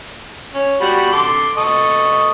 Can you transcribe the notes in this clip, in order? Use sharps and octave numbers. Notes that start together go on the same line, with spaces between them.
C#4
G3 F#4 B5
A4 C6 D6
A4 D#5 C#6